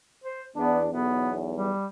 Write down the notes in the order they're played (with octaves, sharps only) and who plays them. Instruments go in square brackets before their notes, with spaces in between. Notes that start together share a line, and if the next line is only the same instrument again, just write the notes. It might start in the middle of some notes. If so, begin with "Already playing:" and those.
[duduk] C5
[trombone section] E2 D4 [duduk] B3
[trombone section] B1 E2 [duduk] B3
[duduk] G3